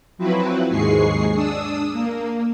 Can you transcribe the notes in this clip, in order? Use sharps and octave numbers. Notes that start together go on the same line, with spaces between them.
F3 F#3 C4 E4 F#4 B4
D#2 G#2 G#3 G#4 C#6 C7
D4 D#6 E6
A#3